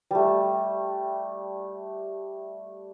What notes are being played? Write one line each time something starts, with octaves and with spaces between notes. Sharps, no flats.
G3 A3